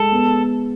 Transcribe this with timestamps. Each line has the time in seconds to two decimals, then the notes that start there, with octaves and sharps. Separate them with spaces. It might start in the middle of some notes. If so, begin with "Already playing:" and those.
Already playing: G#3 A4
0.12 B3